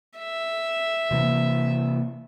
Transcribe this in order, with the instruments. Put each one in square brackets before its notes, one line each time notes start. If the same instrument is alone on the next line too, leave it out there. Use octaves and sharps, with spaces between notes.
[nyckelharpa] E5
[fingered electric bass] C3 E3 A#3